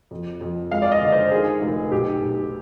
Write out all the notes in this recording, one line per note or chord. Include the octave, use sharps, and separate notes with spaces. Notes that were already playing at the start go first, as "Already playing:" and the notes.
F2
F2
G#3 F5
D5
D#5
D3
C5
D#3 G#4
F1
B1 G4
B1